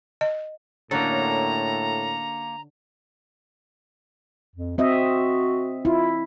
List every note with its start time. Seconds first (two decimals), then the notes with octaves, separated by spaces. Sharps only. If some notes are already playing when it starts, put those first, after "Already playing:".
0.21 D#5
0.91 A2 D3 A#3 C#4 D4 F#4 A4 A#5
4.56 F2
4.78 C4 F#4 D#5 E5
5.85 E4 F4